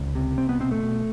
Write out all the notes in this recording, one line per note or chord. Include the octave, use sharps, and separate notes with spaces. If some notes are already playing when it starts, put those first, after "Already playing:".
Already playing: C#2
C3
C2 C4
B3
B2 C4
A3
B2